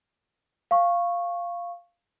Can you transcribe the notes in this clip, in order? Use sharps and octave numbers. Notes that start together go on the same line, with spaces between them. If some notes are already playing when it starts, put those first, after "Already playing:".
F5 C#6